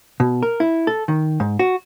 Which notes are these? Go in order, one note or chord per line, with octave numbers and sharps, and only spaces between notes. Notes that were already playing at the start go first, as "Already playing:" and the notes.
B2
A#4
E4
A4
D#3
G#2
F#4